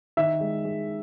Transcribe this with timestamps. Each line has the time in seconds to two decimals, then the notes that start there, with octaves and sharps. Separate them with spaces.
0.17 D#3 E5
0.40 G#3
0.64 G#3